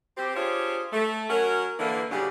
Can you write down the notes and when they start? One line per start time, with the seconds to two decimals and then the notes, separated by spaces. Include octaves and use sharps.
0.17 C4 G4
0.35 D4 F4 G4 G#4 C5 C#5
0.93 A3
1.30 F#3 C#4 F#4 A#4
1.79 D3 E3 A#3
2.11 A2 C#3 F#3 G3 D4 G4